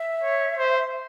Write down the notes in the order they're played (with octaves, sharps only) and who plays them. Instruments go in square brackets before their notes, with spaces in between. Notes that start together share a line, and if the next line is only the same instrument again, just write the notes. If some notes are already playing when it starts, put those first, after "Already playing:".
Already playing: [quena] E5
[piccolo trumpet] C#5
C5